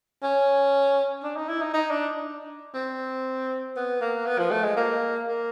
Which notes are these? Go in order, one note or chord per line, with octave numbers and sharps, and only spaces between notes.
C#4
D4
D#4
E4
D#4
D#4
D4
C4
B3
A#3
B3
F3
A3
G#3
A#3
A#3